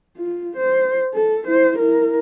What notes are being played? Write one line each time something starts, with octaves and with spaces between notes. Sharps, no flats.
F4
C5
A4
E4 C5
E4 A#4